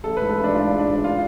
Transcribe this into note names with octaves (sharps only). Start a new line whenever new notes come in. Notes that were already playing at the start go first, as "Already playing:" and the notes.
A1 A4
G#2 B4
A4
A1
D4
G#2 F4
G#3
D4
A1
D4
G#3 F4